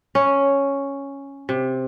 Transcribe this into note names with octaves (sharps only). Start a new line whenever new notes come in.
C#4
C3